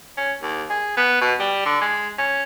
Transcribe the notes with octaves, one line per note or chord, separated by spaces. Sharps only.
C#4
D#2
G#4
B3
B2
G3
D3
G#3
C#4